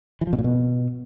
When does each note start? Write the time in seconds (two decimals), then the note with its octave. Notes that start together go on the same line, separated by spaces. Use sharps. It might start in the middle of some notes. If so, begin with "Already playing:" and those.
0.21 E3
0.27 F3
0.33 B2
0.39 A#2
0.44 B2